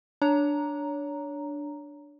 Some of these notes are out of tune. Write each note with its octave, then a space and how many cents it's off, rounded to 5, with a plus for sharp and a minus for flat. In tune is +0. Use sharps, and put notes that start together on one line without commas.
D4 +0 C#5 +20 A#5 +0